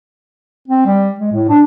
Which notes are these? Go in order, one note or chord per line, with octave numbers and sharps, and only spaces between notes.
C4
G3
G#3
A2
D4